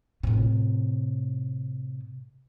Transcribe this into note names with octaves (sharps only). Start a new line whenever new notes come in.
A2 C3